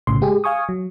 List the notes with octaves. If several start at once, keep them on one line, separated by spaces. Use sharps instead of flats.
B1 A2 C#3 C6
G#3 G4 G#4
F5 G#5 C#6 D#6
F#3